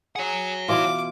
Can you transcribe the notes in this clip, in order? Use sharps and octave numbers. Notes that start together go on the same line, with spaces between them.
G#4 C#5 F#5
B2 E3 F4 D6